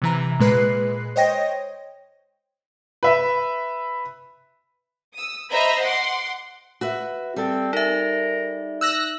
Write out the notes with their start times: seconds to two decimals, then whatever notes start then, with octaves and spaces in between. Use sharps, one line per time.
0.02 C3 E3 A#5
0.39 A#2 G#3 B4 F#6 C7
1.16 C5 C#5 D#5 G5 A#6
3.03 B4 E5 B5
5.14 D#6 E6
5.50 C5 D#5 E5 A#5 B5
5.81 F#5 C6 D6
6.81 F#4 B4 E5
7.36 G3 C4 A4
7.73 D#4 A#4 E5
8.81 E6 F#6 A#6